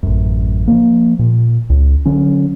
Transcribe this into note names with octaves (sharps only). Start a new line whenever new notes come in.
A1 F#2
F3 F#3 A#3
A#2
C#2
D3 F#3 C#4